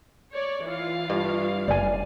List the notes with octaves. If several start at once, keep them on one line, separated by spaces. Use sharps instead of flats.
C#5 D5
E3 F4 F5
G2
F#1 D5 G#5